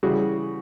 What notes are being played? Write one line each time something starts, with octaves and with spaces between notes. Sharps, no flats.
C#3 E3 G3 F#4 G#4